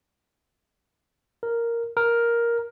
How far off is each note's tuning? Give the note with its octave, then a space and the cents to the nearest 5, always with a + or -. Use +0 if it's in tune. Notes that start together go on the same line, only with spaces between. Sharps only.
A#4 -5
A#4 +5